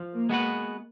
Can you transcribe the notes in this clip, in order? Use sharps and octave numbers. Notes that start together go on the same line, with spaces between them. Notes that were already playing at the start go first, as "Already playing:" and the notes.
Already playing: F3
A#3
G#3 B3 F#4 B4